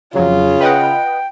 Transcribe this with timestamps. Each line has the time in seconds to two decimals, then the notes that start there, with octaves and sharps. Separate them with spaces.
0.15 F2 C#3 F#3 F4
0.60 B4 D#5 F#5 G5